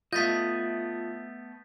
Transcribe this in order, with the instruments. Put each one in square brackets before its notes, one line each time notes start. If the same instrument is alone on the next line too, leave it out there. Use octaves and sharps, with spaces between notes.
[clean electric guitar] A3 B3 D#5 [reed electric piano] F4 [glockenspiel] G6 A6 B6